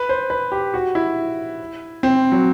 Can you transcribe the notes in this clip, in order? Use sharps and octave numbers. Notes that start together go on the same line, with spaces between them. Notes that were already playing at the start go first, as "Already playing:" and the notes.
Already playing: B4
C5
B4
G4
F#4
E4
C4
F#3